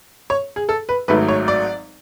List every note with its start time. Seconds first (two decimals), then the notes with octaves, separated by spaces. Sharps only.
0.30 C#5
0.56 G#4
0.69 A4
0.89 B4
1.08 G#1 G#2 F#3 A3 B4
1.28 C#5
1.48 D5